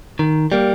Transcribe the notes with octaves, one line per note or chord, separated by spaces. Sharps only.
D#3
G3 A#3